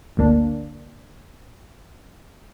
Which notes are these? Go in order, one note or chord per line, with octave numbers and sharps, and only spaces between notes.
G1 D2 A#3 D4